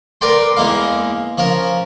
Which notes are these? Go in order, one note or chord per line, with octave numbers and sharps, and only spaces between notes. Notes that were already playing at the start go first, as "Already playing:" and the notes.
A#4 B4 D5 G5 C6
E2 G#3 A#3 D#4 F5
F3 C#4 A#4